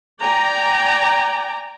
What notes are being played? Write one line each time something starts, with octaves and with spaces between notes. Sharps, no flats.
D5 G5 G#5 A#5